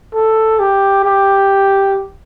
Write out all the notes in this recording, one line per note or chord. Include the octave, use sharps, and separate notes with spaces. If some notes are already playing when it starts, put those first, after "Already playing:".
A4
G4
G4